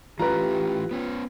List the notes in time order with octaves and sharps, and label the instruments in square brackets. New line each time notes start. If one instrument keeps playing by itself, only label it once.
[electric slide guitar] E3 A3 C#4 [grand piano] F4 B4 [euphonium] G4 [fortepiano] A#5
[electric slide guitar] B3 C#4